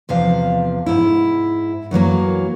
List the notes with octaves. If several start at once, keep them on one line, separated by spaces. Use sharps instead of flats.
E2 C3 F3 F5
G#2 E4
F#2 E3 F#3 A#3